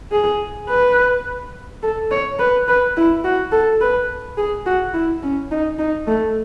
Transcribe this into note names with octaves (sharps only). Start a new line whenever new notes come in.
G#4
B4
A4
C#5
B4
B4
E4
F#4
A4
B4
G#4
F#4
E4
C#4
D#4
D#4
A3